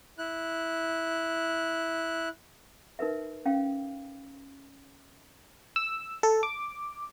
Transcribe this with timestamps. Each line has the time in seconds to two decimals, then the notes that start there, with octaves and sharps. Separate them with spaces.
0.18 E4 F#6
2.99 D#4 A#4 B4 E5
3.45 C#4 F5 G5
5.76 E6
6.23 A4
6.43 D6